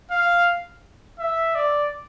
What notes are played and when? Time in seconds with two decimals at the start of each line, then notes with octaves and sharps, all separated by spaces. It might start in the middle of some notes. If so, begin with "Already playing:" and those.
0.11 F5
1.19 E5
1.55 D5